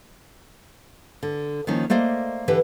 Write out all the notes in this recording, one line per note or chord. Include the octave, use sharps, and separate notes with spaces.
D3
D#3 F3 A#3 C#4
A3 A#3 C5 D5 D#5
D3 E3 G4 B4